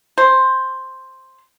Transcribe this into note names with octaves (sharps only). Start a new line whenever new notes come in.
C5